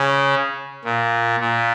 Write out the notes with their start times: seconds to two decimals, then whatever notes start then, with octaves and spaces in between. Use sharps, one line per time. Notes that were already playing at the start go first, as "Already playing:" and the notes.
Already playing: C#3
0.84 A#2
1.40 A#2